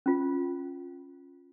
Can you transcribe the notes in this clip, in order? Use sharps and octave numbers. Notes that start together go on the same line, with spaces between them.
C#4 F4